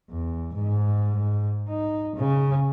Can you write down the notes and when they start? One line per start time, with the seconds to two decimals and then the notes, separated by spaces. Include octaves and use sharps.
0.10 E2
0.54 G#2
1.69 D#4
2.16 C#3